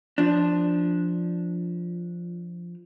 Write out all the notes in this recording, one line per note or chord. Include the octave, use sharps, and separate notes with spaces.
F3 D4